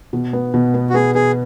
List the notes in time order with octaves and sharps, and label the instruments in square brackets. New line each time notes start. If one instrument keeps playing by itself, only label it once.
[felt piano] B2
B3
B2
B3
[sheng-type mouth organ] F#4
[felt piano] B3 [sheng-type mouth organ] G#4
[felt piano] B3 [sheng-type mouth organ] G#4